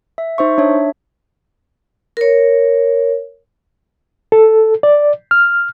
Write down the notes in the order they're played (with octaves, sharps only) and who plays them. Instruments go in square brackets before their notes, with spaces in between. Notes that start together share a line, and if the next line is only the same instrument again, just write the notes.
[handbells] E5
D#4 C5 E5 C#6
D4 C#5 E5
[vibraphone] A#4 C#5
[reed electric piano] A4
D5
F6